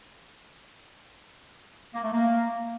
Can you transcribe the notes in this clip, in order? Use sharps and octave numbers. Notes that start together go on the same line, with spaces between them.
A#3
A3
A#3